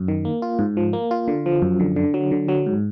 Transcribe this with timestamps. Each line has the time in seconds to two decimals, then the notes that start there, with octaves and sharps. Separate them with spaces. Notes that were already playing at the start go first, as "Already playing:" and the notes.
Already playing: F#2
0.08 D#3
0.25 A#3
0.42 F4
0.59 G#2
0.77 F3
0.93 A#3
1.11 F4
1.28 D3
1.46 F3
1.62 F#2
1.80 D3
1.96 D3
2.14 F#3
2.31 D3
2.48 F#3
2.66 G#2